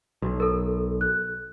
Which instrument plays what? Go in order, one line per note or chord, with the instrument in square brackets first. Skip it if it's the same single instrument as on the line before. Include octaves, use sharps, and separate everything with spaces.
[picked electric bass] B1
[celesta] A4 A#4
F#6